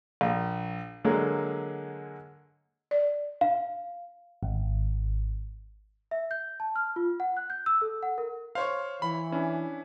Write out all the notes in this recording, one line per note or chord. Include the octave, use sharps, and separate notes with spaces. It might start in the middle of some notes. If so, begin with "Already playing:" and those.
A#1
D3 F#3 G#3 A#3
D5
F5
G#1
E5
G6
A5
F6
F4
F#5
F#6
G6
E6
A4
F#5
A#4
C5 C#5 F5 C#6
E3 B5
C#4 D4 E4